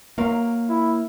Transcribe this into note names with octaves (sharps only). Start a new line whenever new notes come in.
F#3 A#3 A#4 F5
E4